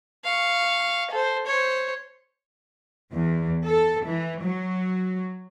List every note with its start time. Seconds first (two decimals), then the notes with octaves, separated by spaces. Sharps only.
0.24 F5 C#6
1.10 A4 C5
1.46 C5 C#5
3.11 E2
3.64 A4
4.03 E3
4.43 F#3